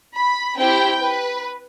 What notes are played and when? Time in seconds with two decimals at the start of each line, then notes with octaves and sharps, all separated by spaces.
0.15 B5
0.57 C4 E4 G4 G5
1.00 B4